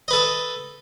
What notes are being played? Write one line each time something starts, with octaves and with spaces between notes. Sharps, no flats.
A4 B4 D#5